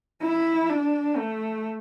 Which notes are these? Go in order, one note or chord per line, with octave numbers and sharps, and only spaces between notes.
E4
D4
A3